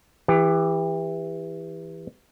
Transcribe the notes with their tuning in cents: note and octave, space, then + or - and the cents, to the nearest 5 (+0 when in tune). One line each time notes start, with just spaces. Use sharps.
E3 +0 G4 +30